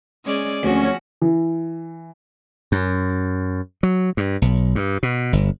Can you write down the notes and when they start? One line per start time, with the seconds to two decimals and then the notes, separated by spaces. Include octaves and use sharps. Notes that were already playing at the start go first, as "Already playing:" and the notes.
0.25 G#3 C#4 D5
0.63 D2 F3 C4 C#4 F#4
1.21 E3
2.72 F#2
3.83 F#3
4.17 G2
4.42 B1
4.75 G2
5.03 B2
5.33 G1